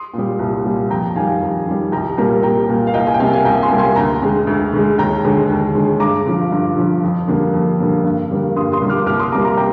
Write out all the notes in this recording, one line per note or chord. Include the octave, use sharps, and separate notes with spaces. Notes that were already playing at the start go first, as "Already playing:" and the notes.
Already playing: C6 D#6
A#2 G3
C2
A#2 G3
F2 G5 A#5
D#3 G3 F5 G#5
F2
D#3 G3
C2 G5 A#5
A#2 G3 A#3 G5 A#5
C2 G5 A#5
A#2 G3 A#3
F5
C2 D#5 G5
F5 G#5
G5
C3 G3 A#3 F5 G#5
F5 G#5
C2 G5 A#5
G#5 C6
C3 G3 A#3
G#5 C6
D2 G5 A#5
D3 G#3
D2
D3 G#3
D#2 G5 A#5
D3 G#3
D#2
D3 G#3
G2 A#5 D6
D3 F3
G2
D3 F3
F2
D3 G3 A#3
F2
D3 G3 A#3
G2
D3 G3 A#3
G2 C6 D#6
C6 D#6
D3 G3 A#3
D6 F6
C2 D6 F6
C6 D#6
C3 G3 A#3 A#5 D6
A#5 D6
G5 A#5